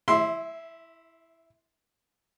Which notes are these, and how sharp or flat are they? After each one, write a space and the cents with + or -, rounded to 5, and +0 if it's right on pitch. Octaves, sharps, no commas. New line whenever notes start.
E4 +0 E5 -30 C6 +0